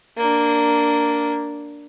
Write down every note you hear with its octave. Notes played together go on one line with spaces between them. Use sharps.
A#3 D4